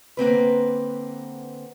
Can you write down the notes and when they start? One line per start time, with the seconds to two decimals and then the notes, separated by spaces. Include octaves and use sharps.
0.17 D3 A#3 C4 B4